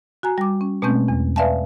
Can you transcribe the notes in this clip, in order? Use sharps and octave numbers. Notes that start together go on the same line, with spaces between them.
F#4 G#5 A#5
G3 D6
C#4
B2 G#3 A3 C4 C#4 G6
E2
B4 D5 E5 F5 G#5 A5